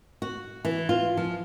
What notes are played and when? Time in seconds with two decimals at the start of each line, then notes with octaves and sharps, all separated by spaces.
0.22 F#4
0.65 E3
0.89 F4
1.17 F3